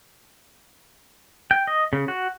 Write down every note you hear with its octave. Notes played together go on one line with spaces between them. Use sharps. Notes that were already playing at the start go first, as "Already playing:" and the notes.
G5
D#5
C#3
F#4